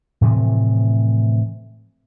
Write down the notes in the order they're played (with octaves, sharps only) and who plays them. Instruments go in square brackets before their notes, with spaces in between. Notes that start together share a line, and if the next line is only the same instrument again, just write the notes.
[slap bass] A2 C3 E3 F3